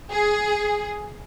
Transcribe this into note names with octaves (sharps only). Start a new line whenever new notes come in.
G#4